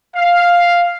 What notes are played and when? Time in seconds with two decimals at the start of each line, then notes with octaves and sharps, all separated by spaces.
0.15 F5